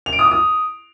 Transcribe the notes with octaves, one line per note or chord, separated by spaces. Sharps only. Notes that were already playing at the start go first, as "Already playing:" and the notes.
F7
D7
D#6
D6
D#6